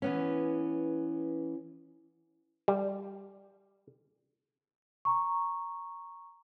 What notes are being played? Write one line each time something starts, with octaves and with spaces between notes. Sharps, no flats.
E3 B3 C#4
G3
A#5 C#6